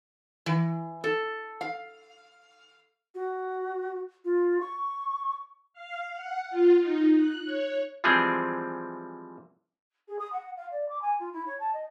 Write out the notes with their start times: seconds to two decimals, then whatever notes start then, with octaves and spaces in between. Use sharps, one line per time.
0.46 E3
1.04 A4
1.61 F5
3.14 F#4
4.24 F4
4.60 C#6
5.73 F5
6.13 F#5
6.50 F4
6.79 D#4
7.14 F#6
7.45 C#5
8.04 E3 F3 G3 G#3 C4 G#4
10.08 G#4
10.19 D#6
10.33 F#5
10.57 F5
10.71 D5
10.89 D6
11.02 G#5
11.20 F4
11.33 E4
11.46 C#5
11.60 A5
11.74 D#5